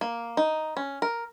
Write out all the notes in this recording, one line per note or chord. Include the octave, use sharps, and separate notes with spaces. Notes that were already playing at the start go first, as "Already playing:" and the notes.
A#3
D#4
C#4
A#4